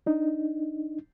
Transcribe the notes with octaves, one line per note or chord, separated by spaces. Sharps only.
D4 D#4